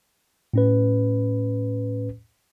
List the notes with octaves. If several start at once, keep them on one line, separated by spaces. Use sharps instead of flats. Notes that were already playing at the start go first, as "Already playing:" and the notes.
A2 C#4 B4